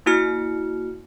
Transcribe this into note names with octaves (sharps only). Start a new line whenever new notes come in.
A#3 E4 F#4 F6 C#7